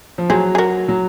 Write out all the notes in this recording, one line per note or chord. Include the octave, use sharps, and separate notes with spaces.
F3
F#3 G#4 C5
G#4
F#4 A#4
F#3